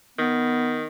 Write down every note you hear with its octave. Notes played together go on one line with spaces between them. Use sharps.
D#3 B3